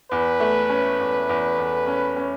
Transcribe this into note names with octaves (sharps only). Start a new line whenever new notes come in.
E2 B4
A3
C#4
E2
E2
E2
C#4
C#4